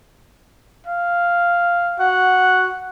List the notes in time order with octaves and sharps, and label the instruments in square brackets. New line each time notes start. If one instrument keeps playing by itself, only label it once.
[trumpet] F5
[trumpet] F#4 [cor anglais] F#5